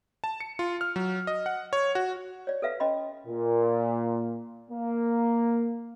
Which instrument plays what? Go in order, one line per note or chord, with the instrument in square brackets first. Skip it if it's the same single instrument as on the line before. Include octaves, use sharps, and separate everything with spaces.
[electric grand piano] A5
C#7
F4
F6
F#3
D#5
F#5
C#5
F#4
[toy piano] C#5 D5
A4 B4 E5 F5
C#4 D#5 B5 C6
[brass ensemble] A#2
A#3